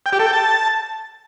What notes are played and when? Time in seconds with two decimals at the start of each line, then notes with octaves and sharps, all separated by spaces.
0.06 G5
0.13 G4
0.19 A4
0.26 G5
0.33 A5